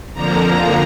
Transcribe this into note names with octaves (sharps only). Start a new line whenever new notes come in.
F2 D3 F3 A#3 A#5